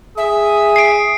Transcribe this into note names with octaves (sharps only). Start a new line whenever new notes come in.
G#4 E5 D#6
C7 D7